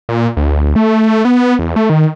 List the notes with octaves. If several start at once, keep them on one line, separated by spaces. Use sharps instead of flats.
A#2
D2
A3
B3
E2
A3
D#3